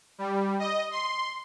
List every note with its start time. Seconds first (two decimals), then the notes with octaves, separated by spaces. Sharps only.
0.18 G3
0.59 D#5
0.91 C6